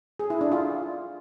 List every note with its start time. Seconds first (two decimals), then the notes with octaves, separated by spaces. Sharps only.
0.19 G#4
0.30 E4
0.41 D4
0.52 F4